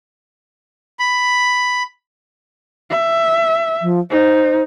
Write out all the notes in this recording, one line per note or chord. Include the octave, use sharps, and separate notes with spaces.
B5
E5
F3
D#4 C5